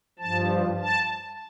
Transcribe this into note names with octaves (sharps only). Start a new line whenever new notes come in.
G2 F3 A5
A5